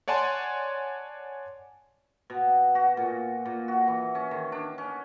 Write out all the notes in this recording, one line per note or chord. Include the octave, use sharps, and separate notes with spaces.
C#5 D5 F#5 G#5 A5 C6
B2
F#4
A#2
A#2
F#4
E3
C#4
D#3
D4
C#4